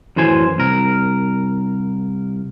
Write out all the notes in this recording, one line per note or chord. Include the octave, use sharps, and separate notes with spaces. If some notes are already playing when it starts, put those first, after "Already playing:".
F#2 A2 E3 C5 G#5
C2 A#4